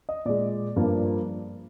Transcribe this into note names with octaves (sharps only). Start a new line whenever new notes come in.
D#5
A#2 G#3 D5
G2 F3 A#3